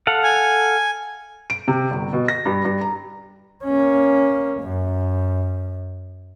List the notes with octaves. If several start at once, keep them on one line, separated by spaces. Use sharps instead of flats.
A4 F5 F#5
G#5
D7
C3
G1
B2
A#6
G2
G2
A#5
A#3 C#4
F#2